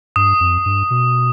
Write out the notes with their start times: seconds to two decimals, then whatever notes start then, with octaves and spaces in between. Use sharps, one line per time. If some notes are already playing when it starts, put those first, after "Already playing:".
0.16 G2 D#6
0.40 F2
0.66 G2
0.91 B2